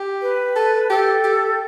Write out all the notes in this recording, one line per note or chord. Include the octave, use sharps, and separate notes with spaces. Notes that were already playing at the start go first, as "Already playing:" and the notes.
Already playing: G4
B4
A4
G4 A4
G4